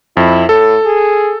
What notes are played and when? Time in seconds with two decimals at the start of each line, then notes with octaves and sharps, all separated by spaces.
0.17 F2 E4
0.49 A2 A4
0.86 G#4